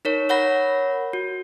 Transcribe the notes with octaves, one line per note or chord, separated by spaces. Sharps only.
D#4 A#4 C#5
A#4 C#5 F#5 B5 A#6
F#4